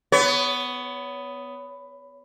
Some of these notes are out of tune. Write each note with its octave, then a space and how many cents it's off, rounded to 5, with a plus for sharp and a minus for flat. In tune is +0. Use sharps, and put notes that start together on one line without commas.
B3 +10 C#5 +30